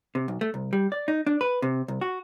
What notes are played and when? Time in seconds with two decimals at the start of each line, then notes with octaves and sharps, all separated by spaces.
0.15 C3
0.28 B1
0.41 A3
0.54 C2
0.73 G3
0.92 D5
1.08 D#4
1.27 D4
1.41 B4
1.62 C3
1.88 C2
2.01 F#4